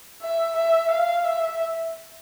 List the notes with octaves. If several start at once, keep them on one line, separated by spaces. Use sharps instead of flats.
E5
E5
F5
E5